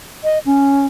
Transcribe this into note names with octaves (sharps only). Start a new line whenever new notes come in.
D#5
C#4